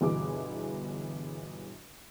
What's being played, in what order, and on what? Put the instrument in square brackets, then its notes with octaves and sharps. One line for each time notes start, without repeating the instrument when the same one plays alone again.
[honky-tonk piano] G1 B2 E3 G#4 D6